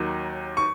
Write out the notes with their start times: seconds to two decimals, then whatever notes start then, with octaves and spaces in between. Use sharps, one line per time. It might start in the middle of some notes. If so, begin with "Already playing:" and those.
Already playing: D#2 D#3 F#3
0.57 C#6